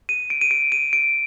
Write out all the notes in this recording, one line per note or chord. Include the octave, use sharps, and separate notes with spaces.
D#7
D7
D#7
D7
D#7
D7